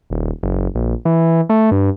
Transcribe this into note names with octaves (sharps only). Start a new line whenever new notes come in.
D#1
F#1
A#1
E3
A3
G2